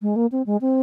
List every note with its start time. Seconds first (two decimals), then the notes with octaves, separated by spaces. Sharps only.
0.02 G#3
0.16 A#3
0.32 C4
0.46 G#3
0.61 C4